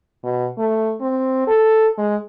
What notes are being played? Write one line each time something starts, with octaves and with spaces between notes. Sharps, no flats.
B2
A3
C4
A4
G#3